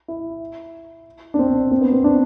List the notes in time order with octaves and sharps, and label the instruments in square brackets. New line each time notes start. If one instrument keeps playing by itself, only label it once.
[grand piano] E4
D4
C4
C4
B3
C4
D4